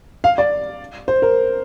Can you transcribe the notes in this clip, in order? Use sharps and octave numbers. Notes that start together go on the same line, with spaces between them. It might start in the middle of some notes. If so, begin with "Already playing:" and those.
F5
D5
C5
A#4